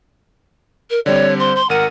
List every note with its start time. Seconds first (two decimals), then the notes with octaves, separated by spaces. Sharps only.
0.90 A#4
1.06 D3 G3 C4 C#5 D5
1.40 C5 C6
1.56 C6
1.70 G#1 A#4 F#5 F6 D#7